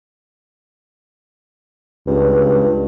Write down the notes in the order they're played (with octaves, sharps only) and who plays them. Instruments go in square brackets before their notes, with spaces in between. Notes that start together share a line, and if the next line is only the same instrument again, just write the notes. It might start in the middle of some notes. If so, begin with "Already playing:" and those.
[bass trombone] C#2 [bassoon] G2